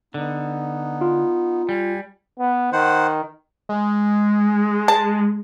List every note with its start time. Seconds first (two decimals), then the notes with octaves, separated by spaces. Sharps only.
0.14 D3 B3 D#4
1.01 F4
1.69 G3 G#5
2.39 B3
2.73 D#3 C5 F#5
3.69 G#3
4.88 A5